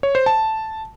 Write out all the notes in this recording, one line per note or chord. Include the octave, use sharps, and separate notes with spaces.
C#5
C5
A5